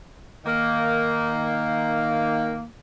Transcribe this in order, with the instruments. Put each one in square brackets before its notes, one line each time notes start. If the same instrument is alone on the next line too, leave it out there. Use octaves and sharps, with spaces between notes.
[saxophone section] D#3 A#3